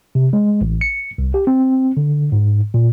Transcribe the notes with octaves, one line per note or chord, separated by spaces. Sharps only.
C3
G#3
A1
C#7
C2
G4
C4
D3
G#2
A#2